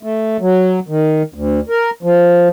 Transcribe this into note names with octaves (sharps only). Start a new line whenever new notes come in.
A3
F#3
D#3
D2
A#4
F3